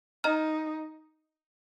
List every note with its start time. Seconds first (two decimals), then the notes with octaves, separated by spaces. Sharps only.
0.24 D#4 D#5 A#5 F6